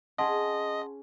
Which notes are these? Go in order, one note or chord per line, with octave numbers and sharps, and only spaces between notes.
C#4 G#4 D#5 F#5 A5 C6